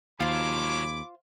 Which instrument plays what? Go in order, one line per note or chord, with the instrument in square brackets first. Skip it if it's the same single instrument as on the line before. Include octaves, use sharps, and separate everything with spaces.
[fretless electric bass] D#2 [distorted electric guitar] F3 F#3 [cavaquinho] F4 C5 [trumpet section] G#5 B5 D6